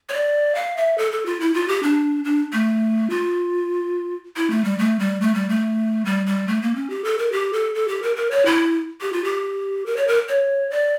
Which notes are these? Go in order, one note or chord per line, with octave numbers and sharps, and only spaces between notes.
C#5
D5
F5
E5
A4
A4
F4
E4
F4
G4
D4
D4
A3
F4
E4
A3
G3
A3
G3
A3
G3
A3
G3
G3
A3
A#3
C#4
G4
A4
A#4
G4
A4
A4
G4
A#4
A#4
C#5
E4
G4
F4
G4
A#4
C#5
A#4
C#5
D5